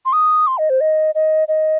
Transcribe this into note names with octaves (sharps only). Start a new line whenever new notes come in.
C6
D#6
C6
D#5
C5
D#5
D#5
D#5